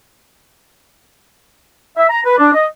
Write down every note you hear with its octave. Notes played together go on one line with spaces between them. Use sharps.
E5
A#5
B4
D4
D#5